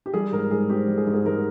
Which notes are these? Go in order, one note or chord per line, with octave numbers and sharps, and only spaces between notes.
G4
G3 G#4
G#2 A#4
G#2 G#4
C4 G4
G3
G#4
G#2
G#4
G#2 A#4